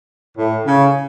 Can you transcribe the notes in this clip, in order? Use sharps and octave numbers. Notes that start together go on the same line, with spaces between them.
A2
C#3